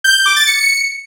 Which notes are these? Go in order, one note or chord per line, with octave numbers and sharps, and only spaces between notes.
G6
G6
D6
A6
C#7